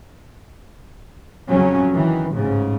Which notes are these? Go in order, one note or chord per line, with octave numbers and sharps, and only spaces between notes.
F2 C#3 F#3 C#4
D#3 E3
A1 G#2 C#3